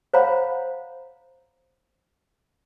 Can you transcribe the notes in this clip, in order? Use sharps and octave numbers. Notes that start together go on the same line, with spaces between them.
C5 C#5 F5 F#5 A#5 B5